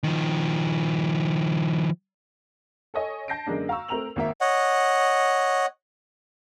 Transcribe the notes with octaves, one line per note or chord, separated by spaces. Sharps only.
D#3 F3
A4 C#5 D#5 G#5
A5 G6 A#6 C7 D7
F#2 D3 G#3 A#3 D4
F5 A#5 C#6 E6
A3 C4 A#4 A#5 F7 F#7
G#1 A#3 E5
C#5 D#5 F#5